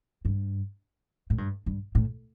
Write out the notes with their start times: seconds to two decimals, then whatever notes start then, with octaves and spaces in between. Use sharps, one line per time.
0.25 G2
1.30 A2
1.38 G2
1.66 G2
1.95 A2